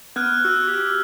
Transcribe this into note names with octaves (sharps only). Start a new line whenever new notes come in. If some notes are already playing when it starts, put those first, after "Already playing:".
B3 F6 F#6 G#6
F#4 E6
G4